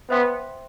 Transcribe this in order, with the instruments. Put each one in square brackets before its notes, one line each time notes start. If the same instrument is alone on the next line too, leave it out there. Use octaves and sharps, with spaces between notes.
[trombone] B3 [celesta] C5 E5 G5 C6